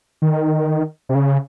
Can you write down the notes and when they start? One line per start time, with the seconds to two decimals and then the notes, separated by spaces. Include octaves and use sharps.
0.22 D#3
1.09 C3
1.15 C#3